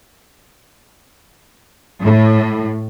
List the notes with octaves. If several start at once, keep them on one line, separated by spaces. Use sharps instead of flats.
A2